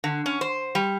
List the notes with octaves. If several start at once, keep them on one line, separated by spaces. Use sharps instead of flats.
D3
C#4
C5
G3